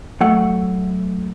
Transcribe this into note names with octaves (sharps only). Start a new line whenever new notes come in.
F#3 A3 F#5